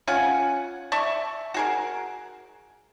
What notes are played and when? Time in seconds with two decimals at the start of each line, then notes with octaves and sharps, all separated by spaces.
0.07 C#4 F4 F#5 G#5
0.92 D5 E5 A5 C#6
1.54 F#4 G#4 A#4